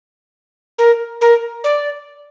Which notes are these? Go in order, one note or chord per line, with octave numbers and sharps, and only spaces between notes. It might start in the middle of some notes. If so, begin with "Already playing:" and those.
A#4
A#4
D5